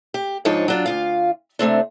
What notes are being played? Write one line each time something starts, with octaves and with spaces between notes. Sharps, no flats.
G4
G#2 F3 D4 D#4 C#5
F#3 D4 F4
D2 F4 F5
C3 A3 C4 D4